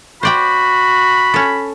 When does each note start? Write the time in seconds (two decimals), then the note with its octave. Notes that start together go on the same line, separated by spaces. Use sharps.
0.23 F#4 C5 D5 G5 B5
1.34 C#4 A4